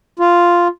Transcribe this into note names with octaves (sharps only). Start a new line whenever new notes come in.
F4